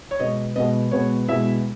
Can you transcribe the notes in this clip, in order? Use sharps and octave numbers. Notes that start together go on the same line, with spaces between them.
C#5
B2 G#3 B3 D#5
B2 G#3 B3 D#5
B2 G#3 B3 C#5
B2 G#3 B3 E4 E5